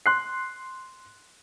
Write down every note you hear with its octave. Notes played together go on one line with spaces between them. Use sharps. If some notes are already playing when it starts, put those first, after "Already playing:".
C6 F#6 C7